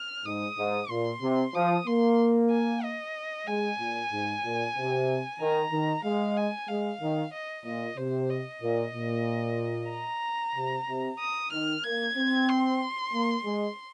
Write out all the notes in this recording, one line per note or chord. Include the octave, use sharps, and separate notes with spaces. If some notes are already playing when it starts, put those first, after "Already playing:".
Already playing: F6
G#2 D#6
G#2
A#2 C6
C3
F3 D#6
A#3 C6
G#5
D#5
G#3 G#5
A#2
G#2
A#2
C3
D#3 A#5
D#3
G#3 F5
G#5
G#3 F5
D#3
D#5
A#2 D#5
C3 C5
D#5
A#2
A#2
A#5
C3
C3
D#6
D#3 F6
A#3 G#6
C4
C6
A#3
G#3